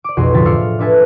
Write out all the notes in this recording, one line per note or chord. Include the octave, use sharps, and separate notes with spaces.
D5 D6
B1 F2 F#4 G#4 C6 D#7
D2 A2 F3 A6 B6 C7
D5 E5 F5 E6 C7 C#7
F6
D4 A4 B4 E5 G#5 A5